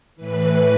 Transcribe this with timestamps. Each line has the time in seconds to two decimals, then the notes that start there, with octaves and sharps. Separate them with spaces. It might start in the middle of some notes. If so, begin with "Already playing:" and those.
0.16 A2 E3 B4